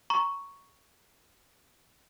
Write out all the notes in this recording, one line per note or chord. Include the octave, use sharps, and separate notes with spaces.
A#5 C#6